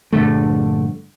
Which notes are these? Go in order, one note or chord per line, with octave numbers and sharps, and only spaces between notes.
A#1 G2 D3 A3